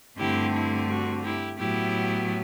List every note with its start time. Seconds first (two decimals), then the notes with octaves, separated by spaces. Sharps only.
0.18 G2 D3 A3 C4 E4 G4
0.54 E4
0.89 F#4
1.24 E4 G4
1.59 A2 F#3 B3 E4 G4